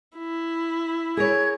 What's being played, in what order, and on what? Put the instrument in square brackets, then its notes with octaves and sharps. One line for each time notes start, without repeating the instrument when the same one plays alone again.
[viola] E4
[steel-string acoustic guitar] G#4 A#4 C#5 [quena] G#6